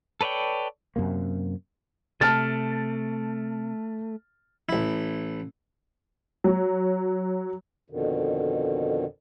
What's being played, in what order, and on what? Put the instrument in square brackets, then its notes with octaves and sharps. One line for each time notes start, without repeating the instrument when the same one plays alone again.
[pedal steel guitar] A4 B4 C#5 D5 G5
[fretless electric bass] F#2 C3 A#3
[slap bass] C3 [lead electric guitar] A3 [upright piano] A5 F6 A6
[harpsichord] A1 E4
[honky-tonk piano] F#3
[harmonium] F2 B2 D3 D#3